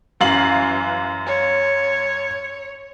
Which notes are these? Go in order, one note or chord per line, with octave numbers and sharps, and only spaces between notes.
F#2 E3 F5 F#7
C#5